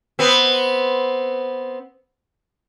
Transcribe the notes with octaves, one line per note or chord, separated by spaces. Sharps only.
B3 C4